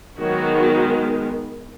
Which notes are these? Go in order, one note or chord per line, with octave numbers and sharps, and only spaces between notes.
D#3 F#3 G#3 B3 F#4